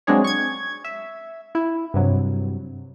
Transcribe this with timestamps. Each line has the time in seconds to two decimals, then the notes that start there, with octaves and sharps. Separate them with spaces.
0.07 F#3 G#3 C4 D4 G#4 C#5
0.24 C#6 G#6
0.84 E5
1.55 E4
1.94 G2 C3 F#3